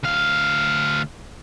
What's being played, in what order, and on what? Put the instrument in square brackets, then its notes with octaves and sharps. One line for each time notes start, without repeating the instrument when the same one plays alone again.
[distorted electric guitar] D2 F5